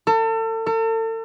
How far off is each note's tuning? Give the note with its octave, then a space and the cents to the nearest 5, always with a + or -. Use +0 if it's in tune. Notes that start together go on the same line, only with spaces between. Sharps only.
A4 +35
A4 +40